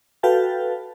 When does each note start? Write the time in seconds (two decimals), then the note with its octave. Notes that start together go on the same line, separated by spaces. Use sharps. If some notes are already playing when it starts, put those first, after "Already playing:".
0.23 F#4 A4 B4 F5 G5 A5